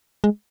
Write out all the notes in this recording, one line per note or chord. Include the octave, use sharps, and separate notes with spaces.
G#3